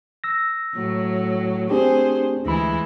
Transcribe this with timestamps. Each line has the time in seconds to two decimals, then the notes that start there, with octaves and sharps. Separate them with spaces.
0.24 E6 A#6
0.75 A2 F#3
1.70 A3 C4 D4 G4 G#4 C5
2.45 D2 E3 G#3 E4 B5